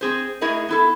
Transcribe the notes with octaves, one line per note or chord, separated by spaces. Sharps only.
C4 G#4 C5
A3 E4 G#4 A#4 D#5 F#5
B3 E4 A4